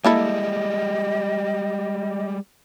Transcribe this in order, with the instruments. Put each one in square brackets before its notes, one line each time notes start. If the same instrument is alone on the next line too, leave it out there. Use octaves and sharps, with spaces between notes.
[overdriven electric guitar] G3 G#3 [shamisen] A#3 E4 A4 [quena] D#5